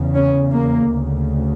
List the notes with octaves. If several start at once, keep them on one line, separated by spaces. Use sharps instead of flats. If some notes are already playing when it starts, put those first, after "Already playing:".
Already playing: E2 C#3
C#4
A#3
D2 C#3